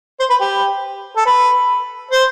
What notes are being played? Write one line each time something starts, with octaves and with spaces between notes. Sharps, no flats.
C5
B4
G4
A4
B4
C5